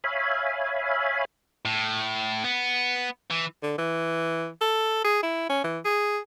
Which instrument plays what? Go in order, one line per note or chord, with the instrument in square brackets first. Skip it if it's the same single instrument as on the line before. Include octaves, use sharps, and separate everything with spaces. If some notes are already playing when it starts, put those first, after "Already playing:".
[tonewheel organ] C#5 E5 F5 G#5 B5
[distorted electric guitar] A2
B3
E3
[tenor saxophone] D3
E3
A4
G#4
E4
C#4
E3
G#4